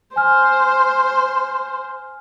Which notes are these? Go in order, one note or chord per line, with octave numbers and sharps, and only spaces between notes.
C5 G#5 F6